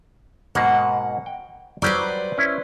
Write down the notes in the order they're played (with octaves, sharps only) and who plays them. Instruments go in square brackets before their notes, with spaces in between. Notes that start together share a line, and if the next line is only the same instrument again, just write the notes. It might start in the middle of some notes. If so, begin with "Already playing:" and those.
[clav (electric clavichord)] G#2 B2 A#3 [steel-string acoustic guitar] F#5
[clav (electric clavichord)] G5
[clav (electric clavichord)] F#3 G3 G4 [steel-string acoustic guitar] B4 C5 D5
[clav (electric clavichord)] C#4 E4